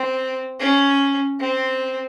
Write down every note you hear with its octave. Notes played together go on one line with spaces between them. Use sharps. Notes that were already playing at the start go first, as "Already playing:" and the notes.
Already playing: C4
C#4
C4